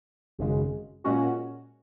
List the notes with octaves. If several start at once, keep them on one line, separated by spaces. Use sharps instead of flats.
G#1 F#2 C#3 G#3
A#2 G#3 C#4 F#4